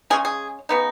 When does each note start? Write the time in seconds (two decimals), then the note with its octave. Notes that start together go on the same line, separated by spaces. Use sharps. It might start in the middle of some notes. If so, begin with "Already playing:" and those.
0.10 C#3 G#3 C#4 G#4
0.25 G#4
0.69 C#3 B3 D#4